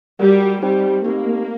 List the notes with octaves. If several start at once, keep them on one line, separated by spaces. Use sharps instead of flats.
G3 F#4 A#4 F#5
G3 C4 D#4 G4 C5 G5
A3 A#3 C4 D#4 G4